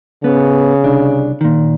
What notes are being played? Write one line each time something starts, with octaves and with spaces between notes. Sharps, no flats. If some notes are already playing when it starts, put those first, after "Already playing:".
C#3 B3
C2 D4
A#2 D#3